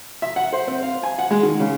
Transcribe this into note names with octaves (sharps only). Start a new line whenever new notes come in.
E5
F#5
C5
C4
F5
G#5
F#5
G#3
D#3
C#3